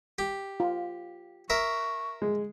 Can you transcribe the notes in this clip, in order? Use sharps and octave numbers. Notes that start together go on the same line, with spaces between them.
G4
F4
A#4 E5 C#6
G#3